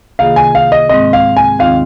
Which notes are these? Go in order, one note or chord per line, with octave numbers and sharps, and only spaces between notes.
C3 D#3 A#3 F4 G#4 F5
G#5
F5
D#5
G#2 G#3 C4 D#5
F5
G#5
D#2 D#3 C4 F4 F5